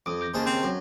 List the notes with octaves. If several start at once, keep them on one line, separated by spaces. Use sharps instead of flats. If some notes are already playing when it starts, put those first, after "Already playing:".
F2 D6 D#6
D6 G6 A#6
D#2 C#3 G#4 C5 D#5 A5
C4
F#2